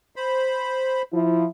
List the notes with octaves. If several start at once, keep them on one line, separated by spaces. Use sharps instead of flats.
C5 B5
F3 E4